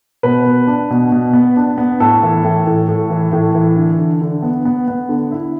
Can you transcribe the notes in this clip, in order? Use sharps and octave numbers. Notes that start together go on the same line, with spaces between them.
B2 B4
B2
D4
B2
B2
B3
D4
B3
A2 A4
E3
A2
A2
A2
E3
A2
E3
D3
D3
D3
B3
B3
B3
D3
E4